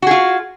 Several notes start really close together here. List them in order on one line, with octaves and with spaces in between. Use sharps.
F#4 G#4 F4